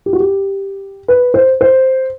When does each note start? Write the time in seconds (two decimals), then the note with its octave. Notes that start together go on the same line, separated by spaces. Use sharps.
0.06 G4
0.13 F#4
0.20 G4
1.08 B4
1.34 C5
1.61 C5